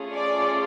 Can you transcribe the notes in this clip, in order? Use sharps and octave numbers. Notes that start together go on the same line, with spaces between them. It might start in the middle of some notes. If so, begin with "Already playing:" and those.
Already playing: A3 C#4 F4 G#4
D5